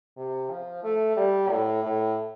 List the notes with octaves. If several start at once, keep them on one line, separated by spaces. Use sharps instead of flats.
C3
F3
A3
G3
A2
A2